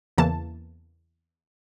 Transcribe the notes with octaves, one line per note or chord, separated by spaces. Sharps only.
E2 C#3 E3 A#3 A5